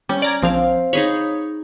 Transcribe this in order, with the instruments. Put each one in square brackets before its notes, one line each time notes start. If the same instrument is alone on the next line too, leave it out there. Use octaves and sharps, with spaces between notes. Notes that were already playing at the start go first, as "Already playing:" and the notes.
[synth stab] G3 [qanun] C#4
[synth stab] D5 A#5 G#6
[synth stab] A#1 F3 [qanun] C4 F5
[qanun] D#4 G#4 B5 [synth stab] C#5